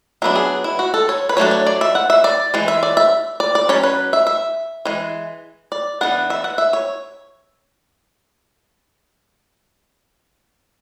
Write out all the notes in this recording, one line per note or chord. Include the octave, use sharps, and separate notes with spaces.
F#3 B3 D4 E5
G#4
E4
F#4
A4
C#5
B4
F#3 A3 D4 C#5
C#5
D5
E5
F#5
E5
D5
E3 G#3
E5
D5
E5
D5
D5
F#3 C#4 C#5
B4
E5
E5
E3 G#3
D5
E3 B3 D4 F#5
E5
F#5
E5
C#5